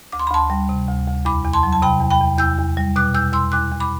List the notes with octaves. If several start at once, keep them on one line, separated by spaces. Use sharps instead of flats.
D2 D6
C6
B5
D2 A5 C6
G3
C3
D2
D2
E2 B5 D6
E2
A5 C6
F#3
A5
C3 G5 B5
E2
G5 B5
E2
E2 E6 G6
E2
G3
B2 D6 F#6
E2 E6 G6
E2 C6 E6
E2 D6 F#6
E2
B5 D6